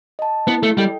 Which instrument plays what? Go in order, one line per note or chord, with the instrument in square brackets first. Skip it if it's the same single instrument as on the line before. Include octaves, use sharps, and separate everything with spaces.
[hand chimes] D#5 A5
[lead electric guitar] B3 [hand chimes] E4
[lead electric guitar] A3
[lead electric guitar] G3 [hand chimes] A4 D#5 G5